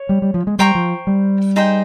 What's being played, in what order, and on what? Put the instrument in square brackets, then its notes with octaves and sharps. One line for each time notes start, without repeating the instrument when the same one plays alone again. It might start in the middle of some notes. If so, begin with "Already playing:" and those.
Already playing: [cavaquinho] C#5
[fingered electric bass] G3
G3
F3
G#3
[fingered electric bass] G3 [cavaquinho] C5 G5 A#5 C#6
[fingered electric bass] F3
G3
[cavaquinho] D#4 G#4 C5 G5